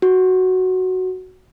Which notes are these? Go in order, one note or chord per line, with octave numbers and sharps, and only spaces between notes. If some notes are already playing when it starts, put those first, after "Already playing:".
F#4